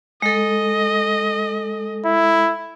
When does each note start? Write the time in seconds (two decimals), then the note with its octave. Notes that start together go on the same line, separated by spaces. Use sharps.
0.22 G#3 A4 D#5
2.05 E4